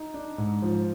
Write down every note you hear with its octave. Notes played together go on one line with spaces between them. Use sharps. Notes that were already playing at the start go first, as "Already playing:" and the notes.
Already playing: D#4
D4
G#2
F3